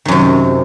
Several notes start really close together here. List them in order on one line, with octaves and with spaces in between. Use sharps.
D#3 F#2 C3